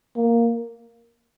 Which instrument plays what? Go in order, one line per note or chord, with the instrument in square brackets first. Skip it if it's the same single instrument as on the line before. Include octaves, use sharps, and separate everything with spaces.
[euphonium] A#3